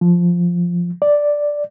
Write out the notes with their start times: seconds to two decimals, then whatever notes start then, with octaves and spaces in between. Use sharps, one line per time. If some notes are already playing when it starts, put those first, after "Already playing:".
0.01 F3
1.02 D5